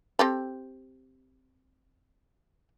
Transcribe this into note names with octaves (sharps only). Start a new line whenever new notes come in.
C4 G4 A4